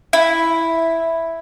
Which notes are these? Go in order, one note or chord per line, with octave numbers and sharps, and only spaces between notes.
E4